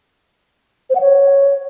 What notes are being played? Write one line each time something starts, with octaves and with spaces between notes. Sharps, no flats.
C5
F#5
C#5